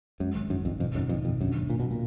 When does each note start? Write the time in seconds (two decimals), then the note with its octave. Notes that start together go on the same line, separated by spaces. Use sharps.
0.19 F#2 G#3
0.35 G#1
0.49 F#2 D#3
0.65 G#1 F2
0.80 F2 B2
0.95 F#2 D#4
1.09 F2 D#4
1.25 F2 B2
1.40 F#2 D4
1.55 D#2
1.70 A#2 D#3
1.80 B2
1.85 F#3
1.91 A#2